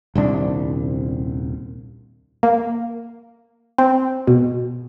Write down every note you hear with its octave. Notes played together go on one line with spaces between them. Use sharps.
D#1 C2 D4
A#3
C4
B2